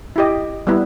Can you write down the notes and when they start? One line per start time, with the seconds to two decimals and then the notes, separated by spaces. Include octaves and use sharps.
0.16 E4 G4 D#5
0.67 G3 B3 E4